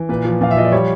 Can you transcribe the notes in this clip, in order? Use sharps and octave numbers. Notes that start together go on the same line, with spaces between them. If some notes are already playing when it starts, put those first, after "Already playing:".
Already playing: E3
A#2 B4
F3
A#2 F5
E5
F3 D#5
D5
G3 C#5